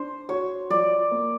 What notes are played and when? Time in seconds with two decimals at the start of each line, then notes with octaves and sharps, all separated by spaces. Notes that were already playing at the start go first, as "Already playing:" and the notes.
Already playing: D4 C5
0.29 F#4 C#5
0.70 F3 D5
1.11 A#3